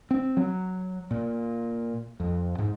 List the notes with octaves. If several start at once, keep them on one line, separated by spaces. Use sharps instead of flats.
C4
F#3
A#2
F2
G#2